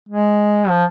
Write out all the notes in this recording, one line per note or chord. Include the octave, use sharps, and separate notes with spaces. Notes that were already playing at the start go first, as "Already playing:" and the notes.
G#3
F3